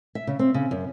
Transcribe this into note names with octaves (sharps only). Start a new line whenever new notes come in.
E5
C#3
C4
C#3
F#2